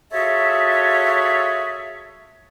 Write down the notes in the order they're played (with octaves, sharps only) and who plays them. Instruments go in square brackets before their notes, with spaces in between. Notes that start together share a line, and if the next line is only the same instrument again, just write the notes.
[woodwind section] F4 F#4 G#4 A4 C#5 E5